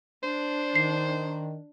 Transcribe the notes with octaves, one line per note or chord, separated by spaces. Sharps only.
D4 C5
D#3 C7